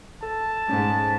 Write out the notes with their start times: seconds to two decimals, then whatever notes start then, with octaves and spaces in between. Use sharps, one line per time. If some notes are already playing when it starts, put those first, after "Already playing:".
0.23 A4 A5
0.69 G#2 C#4